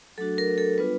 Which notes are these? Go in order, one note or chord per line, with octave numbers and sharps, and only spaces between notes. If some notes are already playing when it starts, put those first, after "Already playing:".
F#3 A3 D4 F#4 A4
A#4
A4
G3 B3 D4 F4 B4